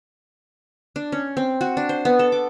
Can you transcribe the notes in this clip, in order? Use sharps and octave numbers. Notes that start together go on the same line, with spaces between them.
D4
C#4
C4
F#4
D4
C5
B3
A4
D6